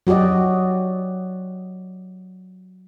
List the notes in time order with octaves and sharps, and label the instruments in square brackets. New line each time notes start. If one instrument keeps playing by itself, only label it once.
[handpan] F#3 F#4 G4 D5 D#5